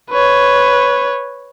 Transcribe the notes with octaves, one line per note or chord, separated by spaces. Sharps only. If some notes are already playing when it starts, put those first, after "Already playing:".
B4 C#5